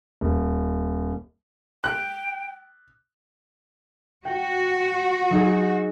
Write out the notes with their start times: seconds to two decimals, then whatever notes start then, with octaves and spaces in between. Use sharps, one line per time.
0.21 D#1
1.84 G5 F#6
4.25 F#4 G5
5.30 F#3 D#4 G#4